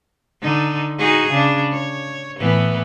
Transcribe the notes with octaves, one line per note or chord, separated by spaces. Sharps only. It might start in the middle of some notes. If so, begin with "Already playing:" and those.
D3 D#4
D#4 F#4 G#4
C#3 D4
C#5
A2 E3 B3